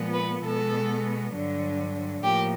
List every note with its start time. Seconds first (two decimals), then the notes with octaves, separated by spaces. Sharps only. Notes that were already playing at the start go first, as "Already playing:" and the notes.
Already playing: A#2 F3 G#3 B3
0.13 B4
0.43 B2 G#3 B3 A4
1.32 G2 D3 F#3
2.22 A2 F3 A#3 G4